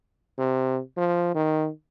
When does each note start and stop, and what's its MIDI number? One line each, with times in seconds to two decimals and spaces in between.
0.38 0.80 48
0.97 1.33 53
1.35 1.69 51